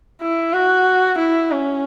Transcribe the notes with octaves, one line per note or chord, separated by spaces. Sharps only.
E4
F#4
E4
C#4